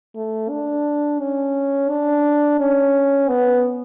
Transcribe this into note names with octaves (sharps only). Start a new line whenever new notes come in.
A3
D4
C#4
D4
C#4
B3